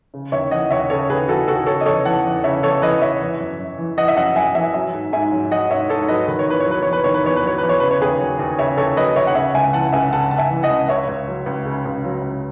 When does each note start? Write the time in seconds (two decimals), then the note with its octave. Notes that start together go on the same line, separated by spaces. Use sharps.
0.14 C#3
0.32 D#2 C#5 E5
0.51 E3 D#5 F#5
0.70 D#2 C#5 E5
0.90 C#3 A4 C#5
1.10 D#2 G#4 B4
1.28 E3 F#4 A4
1.47 D#2 F#4 A4
1.66 C#3 A4 C#5
1.81 D#5
1.86 E2 A4 C#5
2.05 E3 F#5 A5
2.24 E2
2.44 C#3 C#5 E5
2.63 E2 A4 C#5
2.82 E3 B4 D#5
3.02 E2 C#5 E5
3.21 E3
3.39 F#2
3.59 F#2
3.78 E3
3.97 E3 D#5 F#5
4.08 E5
4.17 F#2 D#5 F#5
4.36 F#2 E5 G#5
4.55 E3 E5 G#5
4.74 F#3 E5 G#5
4.94 G#2
5.13 G#2 E5 G#5
5.32 F#3
5.51 F#3 D#5 F#5
5.71 G#2 C#5 E5
5.89 G#2 A4 C#5
6.08 F#3 B4 D#5
6.28 D#3 B4
6.39 C#5
6.47 E2 B4
6.60 C#5
6.66 F#3 B4
6.83 E2 C#5
6.93 B4
7.04 D#3 C#5
7.14 B4
7.24 E2 C#5
7.36 B4
7.43 F#3 C#5
7.58 E2 B4
7.69 C#5
7.80 C#3 B4
7.91 C#5
8.01 D#2 G#4 B4
8.20 F#3
8.39 D#2
8.58 C#3 C#5 E5
8.77 D#2 A4 C#5
8.97 F#3 B4 D#5
9.16 D#2 C#5 E5
9.27 F#5
9.35 C#3 C#5 E5
9.54 C#2 E5 G#5
9.73 E3 F#5 A5
9.92 C#2 E5 G#5
10.12 C#3 F#5 A5
10.31 C#2 A5
10.38 E5 G#5
10.51 E3
10.63 D#5 F#5
10.70 C#2
10.88 C#3 C#5 E5
11.08 C#2
11.28 F#3
11.46 C#2
11.65 C#3
11.85 C#2
12.04 F#3
12.23 C#2